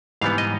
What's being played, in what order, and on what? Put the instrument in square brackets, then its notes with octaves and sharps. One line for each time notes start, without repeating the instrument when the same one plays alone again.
[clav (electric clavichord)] G#2 E3 G3 B3 F5
D#5